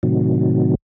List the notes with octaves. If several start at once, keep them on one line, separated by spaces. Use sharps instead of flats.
A2 C3 D#3 F#3